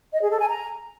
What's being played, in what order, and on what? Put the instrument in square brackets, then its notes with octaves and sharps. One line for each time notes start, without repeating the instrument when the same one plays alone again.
[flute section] D#5
G#4
A4
G#5
A#5